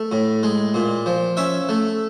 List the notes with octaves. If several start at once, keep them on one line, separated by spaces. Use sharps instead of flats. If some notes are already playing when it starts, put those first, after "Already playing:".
Already playing: A3
A2
G#3
A#2
F3
C#4 E5
A3